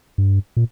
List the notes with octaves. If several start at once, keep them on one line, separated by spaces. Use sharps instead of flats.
G2
A#2